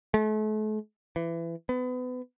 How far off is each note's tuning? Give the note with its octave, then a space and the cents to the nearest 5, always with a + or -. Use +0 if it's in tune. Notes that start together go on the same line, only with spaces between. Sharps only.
A3 -40
E3 +25
B3 +30